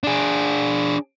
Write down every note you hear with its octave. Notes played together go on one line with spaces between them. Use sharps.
D4 G#4